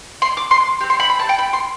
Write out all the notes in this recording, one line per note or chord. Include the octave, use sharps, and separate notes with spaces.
C6
D6
C6
C4 G4
C6
B5
B5
A5
G5
B5
C6